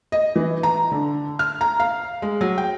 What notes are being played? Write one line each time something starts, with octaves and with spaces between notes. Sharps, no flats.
D#5
E3
A#5
D3
F6
A#5
F5
G#3
F#3
G5